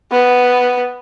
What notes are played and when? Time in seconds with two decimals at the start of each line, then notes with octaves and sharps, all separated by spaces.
0.11 B3